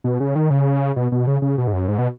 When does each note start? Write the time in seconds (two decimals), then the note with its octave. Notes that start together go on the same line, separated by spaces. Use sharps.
0.04 B2
0.20 C#3
0.35 D#3
0.50 C#3
0.96 B2
1.12 B2
1.27 C#3
1.42 C#3
1.58 B2
1.67 G#2
1.73 F#2
1.88 G#2
1.98 B2